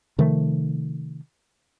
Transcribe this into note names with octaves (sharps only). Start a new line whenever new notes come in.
C3 D#3 F3 A3